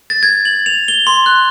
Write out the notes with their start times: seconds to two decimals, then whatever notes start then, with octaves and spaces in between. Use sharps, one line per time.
0.10 A6
0.23 G#6
0.45 F#7
0.66 F7
0.88 G7
1.07 C6
1.26 F#6